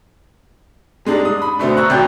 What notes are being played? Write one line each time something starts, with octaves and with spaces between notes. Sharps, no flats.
G3 G#3 D4 D#4
D#6
B5
B2 D3 A3 C4
A#5 C#6 E6 F#6
G#1 B2 G5 G6